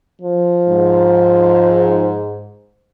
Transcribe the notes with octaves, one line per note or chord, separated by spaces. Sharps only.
F3
G#2